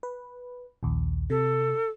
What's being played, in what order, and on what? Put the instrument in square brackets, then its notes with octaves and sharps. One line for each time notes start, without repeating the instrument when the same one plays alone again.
[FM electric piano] B4
A#1 D#2
[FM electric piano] C3 [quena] A4